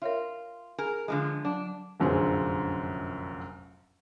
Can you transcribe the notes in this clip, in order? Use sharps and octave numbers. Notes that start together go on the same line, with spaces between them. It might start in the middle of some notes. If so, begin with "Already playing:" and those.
F4 A#4 C#5 E5
G#4 A#4 G#5
D3 F3 G#3
F#3 D4
F1 A#1 F#2 D3 C4 G#4